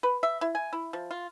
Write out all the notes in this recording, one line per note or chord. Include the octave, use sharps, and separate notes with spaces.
B4
E5
E4
G#5
E4
F3
F4